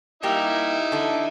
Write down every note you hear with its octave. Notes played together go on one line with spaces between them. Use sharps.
G3 A#3 D#4 E4 G4 E5
D3 A4